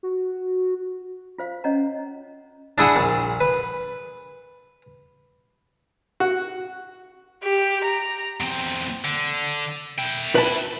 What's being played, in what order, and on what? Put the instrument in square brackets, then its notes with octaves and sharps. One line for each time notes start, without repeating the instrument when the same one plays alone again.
[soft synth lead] F#4
[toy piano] F4 C5 F5
C#4 C#5 D#5 F#5 A#5
[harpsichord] D4 E4 G#4 F#5 B5
A#1
B4
[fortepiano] F#4
[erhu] G4
A#5
[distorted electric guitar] E2 C4
D3
E4 G5
[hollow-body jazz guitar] B4 A5